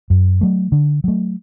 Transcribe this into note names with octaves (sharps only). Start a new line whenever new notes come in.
F#2
F#3 A3
D3
F#3 A3